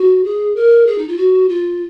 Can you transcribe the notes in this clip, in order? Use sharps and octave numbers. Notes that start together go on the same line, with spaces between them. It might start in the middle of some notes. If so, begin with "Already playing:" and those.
Already playing: F#4
G#4
A#4
G#4
D#4
F4
F#4
F4